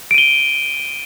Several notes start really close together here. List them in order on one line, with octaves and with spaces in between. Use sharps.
D7 D#7 G7